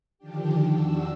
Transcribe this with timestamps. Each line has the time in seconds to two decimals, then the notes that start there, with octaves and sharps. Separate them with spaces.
0.18 D3 D#3 F3 D4 G4
0.70 E2 D4 F#4 E6